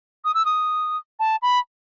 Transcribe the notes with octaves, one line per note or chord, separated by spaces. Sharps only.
D#6
E6
D#6
A5
B5